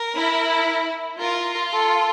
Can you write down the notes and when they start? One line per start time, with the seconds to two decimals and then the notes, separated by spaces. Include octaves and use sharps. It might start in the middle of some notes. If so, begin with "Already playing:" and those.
Already playing: A#4
0.15 E4
1.21 F4 A#4
1.74 A4